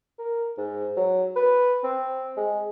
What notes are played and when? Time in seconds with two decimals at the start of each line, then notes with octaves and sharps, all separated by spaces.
0.18 A#4
0.57 G#2
0.97 F#3
1.36 B4
1.83 C4
2.37 G#3